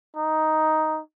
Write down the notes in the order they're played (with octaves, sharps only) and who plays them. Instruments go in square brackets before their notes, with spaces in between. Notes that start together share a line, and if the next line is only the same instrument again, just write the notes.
[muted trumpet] D#4